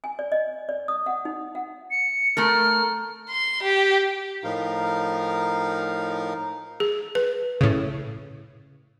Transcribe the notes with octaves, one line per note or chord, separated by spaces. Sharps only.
G#5
D5
D#5
D5
D#6
F#5
D#4
F#5
C#7
A3 A4 A#4 F6
C6
G4
A2 F3 D#4 A#4 F5
G#4
B4
A2 C#3